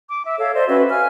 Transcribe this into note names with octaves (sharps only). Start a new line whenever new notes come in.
D6
E5
A4 C#5 F5
C5 D5 D#5
C#4 F#4 B4 E5
F5 G#5 F6